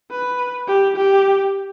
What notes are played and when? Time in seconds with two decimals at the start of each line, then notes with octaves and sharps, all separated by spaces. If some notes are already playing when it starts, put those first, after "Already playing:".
0.11 B4
0.68 G4
0.96 G4